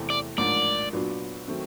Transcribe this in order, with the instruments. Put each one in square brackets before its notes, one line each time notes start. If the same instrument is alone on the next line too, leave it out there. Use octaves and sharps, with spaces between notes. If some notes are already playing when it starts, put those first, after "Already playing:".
Already playing: [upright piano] E2 C3 E3 A3 C4
[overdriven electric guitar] D5
[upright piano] A1 G#2 F3 A#3 D4 [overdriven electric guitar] D5
[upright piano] A#2 F#3 B3 D4
D#3 F#3 A3 C4